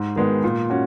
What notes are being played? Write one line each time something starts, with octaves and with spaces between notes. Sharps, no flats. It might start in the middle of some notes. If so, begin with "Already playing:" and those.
Already playing: G#2
D#3 G#3 B3
A#2
C#4 F#4